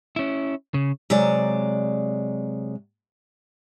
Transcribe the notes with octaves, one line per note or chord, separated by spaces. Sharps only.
C#4 E4
C#3
C3 F#3 G#3 D5